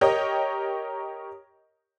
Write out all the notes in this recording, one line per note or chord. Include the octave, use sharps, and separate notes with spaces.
G4 A#4 C#5 D#5